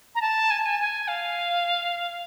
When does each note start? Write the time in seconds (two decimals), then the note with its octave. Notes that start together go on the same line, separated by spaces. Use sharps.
0.15 A#5
0.21 A5
0.51 G#5
0.58 A5
0.65 G#5
0.79 G#5
1.08 F5